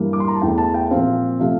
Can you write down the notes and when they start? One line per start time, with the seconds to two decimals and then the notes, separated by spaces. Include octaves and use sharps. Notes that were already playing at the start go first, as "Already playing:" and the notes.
Already playing: G2 E3 A#3
0.13 D6
0.20 C6
0.28 A#5
0.36 A5
0.42 E2 E3 A3 G5
0.58 A5
0.74 G5
0.91 A#2 F3 C4 F5
1.40 C3 F3 A3 F5